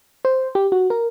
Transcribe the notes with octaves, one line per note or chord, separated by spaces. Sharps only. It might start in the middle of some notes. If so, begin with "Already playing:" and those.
C5
G4
F#4
A#4